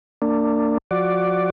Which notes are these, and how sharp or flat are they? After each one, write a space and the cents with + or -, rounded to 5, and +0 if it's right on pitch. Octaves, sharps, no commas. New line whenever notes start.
A#3 -35 D4 +0
F3 +25 F#4 +10 D5 +0